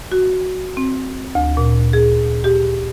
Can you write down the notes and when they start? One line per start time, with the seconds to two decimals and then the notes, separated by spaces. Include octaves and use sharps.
0.12 F#4
0.77 C4
1.35 D2
1.57 A#2
1.93 G#4
2.44 G4